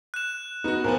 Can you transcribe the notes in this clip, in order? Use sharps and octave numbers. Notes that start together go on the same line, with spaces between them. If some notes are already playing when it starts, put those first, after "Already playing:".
F#6 E7
B3 D#4 F#4
A#2 F3 B3 A#4